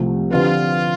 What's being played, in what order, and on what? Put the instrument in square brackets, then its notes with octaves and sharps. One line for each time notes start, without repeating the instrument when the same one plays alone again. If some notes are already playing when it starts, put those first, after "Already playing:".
Already playing: [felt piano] C2 C3 F3 A3
[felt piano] D3 F3 C4 G4 B4 [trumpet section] F4